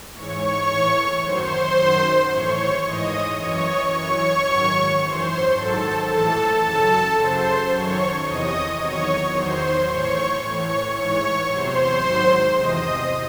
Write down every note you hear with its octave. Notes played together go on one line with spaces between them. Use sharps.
G#2 E3 C#5 C#6
A2 E3
F#2 D#3 F#3 C5 C6
F#2 D#3 F#3
A2 E3 C#5 C#6
G#2 E3 D#5 D#6
F#2 E3 C#5 C#6
F#2 E3 C#5 C#6
G#2 D#3 F#3
F#2 E3 C5 C6
G#2 D#3 F#3 A4 A5
A2 E3 A4 A5
F#2 C#3 F#3 A4 A5
F#2 C#3 F#3 C5 C6
F#2 D#3 F#3 C#5 C#6
E2 C3 E3 D#5 D#6
E2 D#3 F#3 C#5 C#6
E2 D#3 F#3 C5 C6
A2 E3 C#5 C#6
A2 E3 C#5 C#6
G#2 E3 C#5 C#6
E2 C3 F#3 C5 C6
G#2 D#3 F#3
E2 C3 E3 D#5 D#6